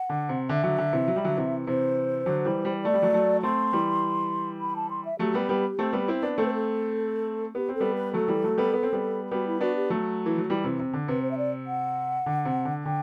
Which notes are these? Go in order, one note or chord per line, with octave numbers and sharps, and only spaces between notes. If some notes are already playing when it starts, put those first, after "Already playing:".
Already playing: F#5
D3
C3
D3 E5
D3 F#3
D3
C3 E3
F#3
G3
D3 F#3
C3 E3
C3 E3 C5
D3 F#3
E3 G3
E3 G3
A3 D5
G3
F#3 A3
F#3 A3
A3 C4 C6
E3 G3
B5
A5
C6
E5
F#3 A3 G4
G3 B3
G3 B3
A3 C4
G3 B3
C4 E4
B3 D4
A3 C4 A4
B4
A4
B3 G4
C4
A4
G3 B3
B4
F#3 A3 A4
E3 G3
F#3 A3
G3 B3
B3
C4
G3 B3
G3 B3 F#4
E4
B3 D4 F#4
G4
F#3 A3
E3
F#3
E3 G3
C3 E3
C3
D3
C3 B4
C5
E5
D5
F#5
D3
C3
D3
D3 G5